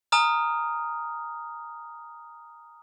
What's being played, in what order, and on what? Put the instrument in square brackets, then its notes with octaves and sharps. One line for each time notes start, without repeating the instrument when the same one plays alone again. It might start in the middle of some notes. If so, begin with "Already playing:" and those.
[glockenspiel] G#5 A#5 D#6 F6